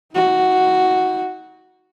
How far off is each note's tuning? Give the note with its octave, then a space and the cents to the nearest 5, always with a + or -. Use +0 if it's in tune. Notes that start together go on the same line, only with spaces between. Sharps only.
D#4 +45 F#4 +0